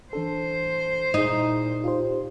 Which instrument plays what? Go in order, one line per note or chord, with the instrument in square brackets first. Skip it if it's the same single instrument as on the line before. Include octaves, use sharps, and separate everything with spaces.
[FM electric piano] E3 D4 A4 [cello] C5
[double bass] A#2 [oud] D#4 [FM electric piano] E4 G#4
[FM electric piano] F4 G4 C5